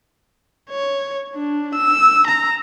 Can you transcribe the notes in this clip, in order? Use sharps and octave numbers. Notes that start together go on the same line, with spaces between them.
C#5
D4
E6
A#5